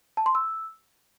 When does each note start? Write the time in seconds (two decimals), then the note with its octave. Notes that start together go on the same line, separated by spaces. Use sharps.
0.17 A5
0.26 C6
0.35 E6